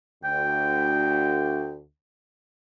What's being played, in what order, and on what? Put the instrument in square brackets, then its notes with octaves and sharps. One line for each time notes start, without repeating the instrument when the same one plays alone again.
[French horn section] D2 [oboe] G5